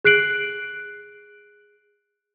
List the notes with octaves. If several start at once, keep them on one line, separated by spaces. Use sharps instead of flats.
G#4 F#6 C7 D7 F#7